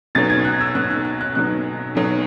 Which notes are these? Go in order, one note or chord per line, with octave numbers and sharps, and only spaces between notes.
B1 B2 F#3 A6
G#6
F#6
E6
B1 B2 F#3 F#6
F#6
F#6
F#6
B1 B2 F#3 F#6
B1 B2 F#3